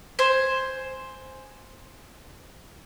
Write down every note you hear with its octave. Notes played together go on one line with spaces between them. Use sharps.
C5 G#5